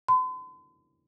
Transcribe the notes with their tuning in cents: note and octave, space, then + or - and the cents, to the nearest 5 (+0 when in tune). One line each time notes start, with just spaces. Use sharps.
C6 -45